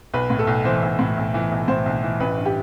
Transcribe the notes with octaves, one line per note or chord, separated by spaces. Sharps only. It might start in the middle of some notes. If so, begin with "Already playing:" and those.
B1 B4
A2
A4
B1
E3 C5
B1
A2
B1
E3
B1
A2 C5
B1
E3
A1 B4
G2
G4